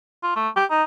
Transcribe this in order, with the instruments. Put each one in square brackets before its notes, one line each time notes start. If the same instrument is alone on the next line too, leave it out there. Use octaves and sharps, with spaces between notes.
[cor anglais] F4
A3
G4
D#4